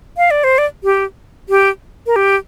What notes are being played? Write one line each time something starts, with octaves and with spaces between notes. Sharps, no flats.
F5
D5
C5
D5
G4
G4
A#4
G4